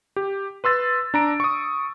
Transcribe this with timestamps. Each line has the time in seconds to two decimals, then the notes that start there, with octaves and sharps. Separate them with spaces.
0.16 G4
0.64 B4 C6 E6 A6
1.14 D4 A#5 D7
1.40 C#6 D#6